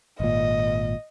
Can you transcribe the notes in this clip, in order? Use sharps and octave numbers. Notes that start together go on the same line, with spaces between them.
G#1 A#2 D#5